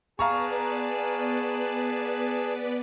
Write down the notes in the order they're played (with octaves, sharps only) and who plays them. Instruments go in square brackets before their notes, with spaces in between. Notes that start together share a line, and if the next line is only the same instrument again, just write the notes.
[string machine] B3 B4 D5 [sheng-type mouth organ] G#4 A5 [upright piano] F5 A#5 C#6